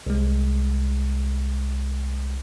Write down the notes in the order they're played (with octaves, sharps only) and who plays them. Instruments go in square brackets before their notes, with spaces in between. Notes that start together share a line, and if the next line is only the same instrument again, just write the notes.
[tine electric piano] C2 G#3